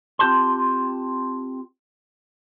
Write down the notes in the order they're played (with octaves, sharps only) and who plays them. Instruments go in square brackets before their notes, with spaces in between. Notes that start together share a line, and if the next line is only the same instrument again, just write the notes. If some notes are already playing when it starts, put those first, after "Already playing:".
[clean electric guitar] C4 F4 G4 A5 C6